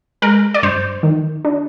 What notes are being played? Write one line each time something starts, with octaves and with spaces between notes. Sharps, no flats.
G#3 A#4
D5
G2 C5
D#3
D4